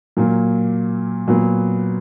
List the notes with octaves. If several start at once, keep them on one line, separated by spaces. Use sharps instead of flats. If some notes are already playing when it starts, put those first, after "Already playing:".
A#2 F#3 A#3
A#2 F#3 B3